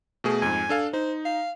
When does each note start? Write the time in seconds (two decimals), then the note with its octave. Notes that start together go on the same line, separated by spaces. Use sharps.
0.24 B2 A3 G#4
0.42 F2 G#2 G#5
0.69 D4 A4 F5
0.93 D#4 C5
1.25 F5